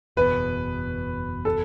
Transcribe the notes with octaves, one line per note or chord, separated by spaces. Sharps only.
F#1 E2 B2 B4
A4